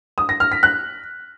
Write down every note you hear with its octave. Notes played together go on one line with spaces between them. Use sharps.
D#6
A#6
F6
B6
F#6